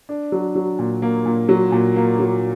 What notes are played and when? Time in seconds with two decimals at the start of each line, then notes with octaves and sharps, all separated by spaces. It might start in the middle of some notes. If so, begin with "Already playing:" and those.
0.09 D4
0.32 F#3
0.55 F#3
0.79 A#2
1.02 A#3
1.26 A#2
1.49 F#3
1.72 A#2
1.96 A#3
2.19 F#3